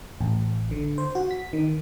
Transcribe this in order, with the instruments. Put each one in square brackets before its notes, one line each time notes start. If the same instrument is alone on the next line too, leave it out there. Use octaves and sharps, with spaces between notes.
[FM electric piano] A1
D3
C5
F#4
B6
D#3